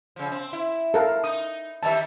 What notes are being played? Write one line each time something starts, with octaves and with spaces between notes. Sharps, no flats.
C#3 F3
C4
E4
A4 A#4 F5
D#4 D#6
D#3 E3 G3 E5 A5